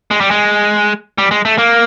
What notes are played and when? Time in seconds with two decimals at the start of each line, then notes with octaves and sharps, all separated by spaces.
0.11 G#3
0.21 G3
0.31 G#3
1.18 G3
1.31 G#3
1.45 A3
1.58 A#3